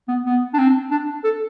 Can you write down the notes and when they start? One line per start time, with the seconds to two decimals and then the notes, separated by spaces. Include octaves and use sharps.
0.08 B3
0.26 B3
0.54 D4
0.59 C4
0.91 D4
1.24 A4